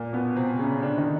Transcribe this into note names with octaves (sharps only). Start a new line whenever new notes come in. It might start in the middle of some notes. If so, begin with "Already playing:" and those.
Already playing: A#2 A#3
B2 B3
C3 C4
C#3 C#4
D3 D4
D#3 D#4